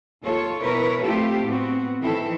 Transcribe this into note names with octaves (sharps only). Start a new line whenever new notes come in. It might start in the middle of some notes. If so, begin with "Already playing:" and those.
D#2 F4 A4 C#5
B2 E3 E4 A#4 B4 C#5
A3 C4 E4 F4 G4 A4
A2 B3 C4 F#4
D#3 E3 C4 E4 A4